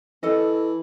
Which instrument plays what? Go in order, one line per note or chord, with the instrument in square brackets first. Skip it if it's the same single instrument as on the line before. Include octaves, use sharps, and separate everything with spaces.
[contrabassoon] E3 [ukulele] A4 D#5